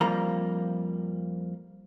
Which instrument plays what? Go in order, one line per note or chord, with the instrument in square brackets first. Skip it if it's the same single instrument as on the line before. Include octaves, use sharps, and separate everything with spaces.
[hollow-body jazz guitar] F2 F3 G3 A#3 A#5